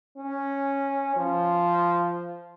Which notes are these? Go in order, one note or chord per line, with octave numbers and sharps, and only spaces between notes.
C#4
F3